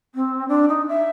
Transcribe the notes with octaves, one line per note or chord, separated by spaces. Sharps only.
C4
D4
D#4
E5